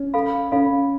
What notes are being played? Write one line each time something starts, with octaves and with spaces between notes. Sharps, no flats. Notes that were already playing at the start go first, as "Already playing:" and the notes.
Already playing: C#4
A4 F5 B5
C#4 A4 F5 B5